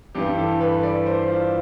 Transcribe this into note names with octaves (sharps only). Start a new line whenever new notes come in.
G2 E3 G4
A4
B4
D5
C5
F4